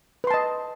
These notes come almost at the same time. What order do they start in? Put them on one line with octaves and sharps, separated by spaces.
B4 C6 A5 D#5